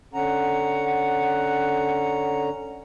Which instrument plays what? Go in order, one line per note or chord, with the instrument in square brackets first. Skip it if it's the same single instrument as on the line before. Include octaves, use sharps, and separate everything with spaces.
[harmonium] D3 C#4 A#5 [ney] F#5